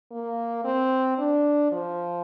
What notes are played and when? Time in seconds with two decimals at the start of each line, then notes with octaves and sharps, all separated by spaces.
0.11 A#3
0.65 C4
1.18 D4
1.72 F3